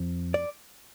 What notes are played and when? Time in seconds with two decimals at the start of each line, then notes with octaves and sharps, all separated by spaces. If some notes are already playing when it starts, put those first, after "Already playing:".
Already playing: F2 F3
0.34 D5